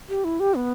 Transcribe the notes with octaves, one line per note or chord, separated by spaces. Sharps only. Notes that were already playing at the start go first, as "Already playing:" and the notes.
G4
E4
G4
B3